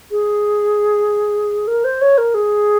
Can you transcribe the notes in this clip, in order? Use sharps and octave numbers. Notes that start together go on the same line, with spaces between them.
G#4
A#4
C5
C#5
A#4
G#4